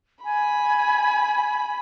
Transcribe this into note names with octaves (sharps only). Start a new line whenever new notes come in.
G#5 B5